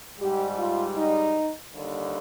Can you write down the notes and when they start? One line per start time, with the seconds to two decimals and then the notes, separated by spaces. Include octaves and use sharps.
0.20 G#2 G3 G4
0.58 F4
0.97 D#4
1.74 D#2 D3 G3